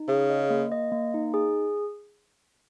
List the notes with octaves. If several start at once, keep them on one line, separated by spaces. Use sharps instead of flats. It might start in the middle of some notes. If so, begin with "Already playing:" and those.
Already playing: D#4
C#3 G#4
D#5
A#3
D#5
A#3
D#4
G#4